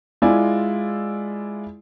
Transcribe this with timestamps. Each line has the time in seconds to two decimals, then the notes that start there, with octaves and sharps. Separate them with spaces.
0.22 G#3 E4 F4 D5 G#5